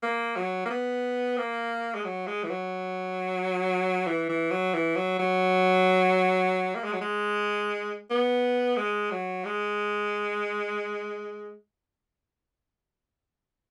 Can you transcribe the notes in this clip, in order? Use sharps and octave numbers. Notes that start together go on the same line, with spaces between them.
A#3
F#3
A#3
B3
A#3
G#3
F#3
G#3
E3
F#3
E3
E3
F#3
E3
F#3
F#3
A#3
G#3
F#3
G#3
B3
G#3
F#3
G#3